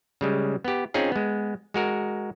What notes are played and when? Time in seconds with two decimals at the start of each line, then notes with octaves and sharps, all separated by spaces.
0.21 C#3 G3 G#3
0.64 B3 G4
0.94 C4 C#4 D#4 F4 G#4
1.12 G#3 B3
1.74 G#3 F#4 A#4